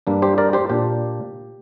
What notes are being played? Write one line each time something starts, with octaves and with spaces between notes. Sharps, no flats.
G2 G3 A#3 D4
G4 C5
A#4 D5
G4 C5
A#2 A#3 D4 G4